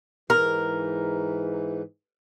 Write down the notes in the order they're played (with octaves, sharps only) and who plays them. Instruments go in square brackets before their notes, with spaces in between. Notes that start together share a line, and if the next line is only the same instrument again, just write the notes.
[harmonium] G#2 E3 [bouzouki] A#4